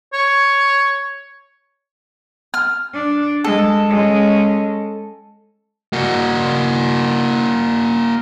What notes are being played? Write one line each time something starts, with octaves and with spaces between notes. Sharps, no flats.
C#5
F6
D4
G#3 A4
G#3 C#4
A#3 F#4